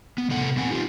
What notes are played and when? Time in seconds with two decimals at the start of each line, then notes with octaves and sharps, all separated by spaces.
0.18 B3
0.30 A2 C3 A4 F#5
0.57 A#2 B3 C4 F#5 G#5
0.71 D#4 F4 G4